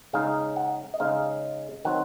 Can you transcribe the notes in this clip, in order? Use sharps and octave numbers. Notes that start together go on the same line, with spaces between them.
C#3 G#3 D#4 F5
F#5
D#5
C#3 G#3 D#4 F5
D#3 F#3 C4 F#5